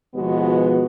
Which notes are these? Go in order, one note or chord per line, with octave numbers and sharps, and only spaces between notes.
D#2 B2 F3 G#3 B3 F#4